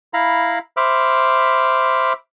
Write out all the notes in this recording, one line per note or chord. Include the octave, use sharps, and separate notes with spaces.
E4 F5 A#5 B5
C5 E5 B5 D6 F6